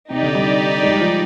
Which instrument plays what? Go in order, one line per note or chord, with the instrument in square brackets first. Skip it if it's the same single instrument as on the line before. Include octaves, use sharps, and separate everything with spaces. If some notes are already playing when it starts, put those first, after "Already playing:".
[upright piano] C3 [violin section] D#4 G4 D5
[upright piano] D3
G3
G#3
G3
F3